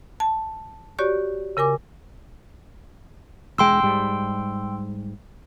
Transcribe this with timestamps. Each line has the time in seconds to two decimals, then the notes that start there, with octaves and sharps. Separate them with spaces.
0.20 A5
0.99 F#4 G4 C#5 D5 C#6
1.57 C#3 A#4 G#5 D6
3.58 E1 G#3 G5 C6 E6
3.83 G#2 G3